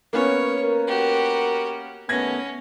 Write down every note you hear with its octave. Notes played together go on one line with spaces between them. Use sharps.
A#3 B3 C#4 C#5
A#4
F#4 G4
D#2 A3 B3 C#4 G#6 A#6